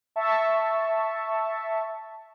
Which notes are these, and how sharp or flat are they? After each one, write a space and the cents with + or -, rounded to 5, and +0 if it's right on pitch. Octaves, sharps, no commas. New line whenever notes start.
E5 +0 A5 +0 C#6 +0